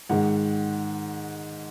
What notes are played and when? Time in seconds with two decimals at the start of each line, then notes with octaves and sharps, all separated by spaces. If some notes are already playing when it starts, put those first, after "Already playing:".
0.09 G#2 D#3 G#3 F#5